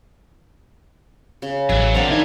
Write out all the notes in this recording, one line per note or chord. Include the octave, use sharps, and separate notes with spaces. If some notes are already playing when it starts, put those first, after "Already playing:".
C#3
A1 F#3 E5
A#3 C4 D4 C5 D5 F#5 A#5
E3 D#4 E5 G#5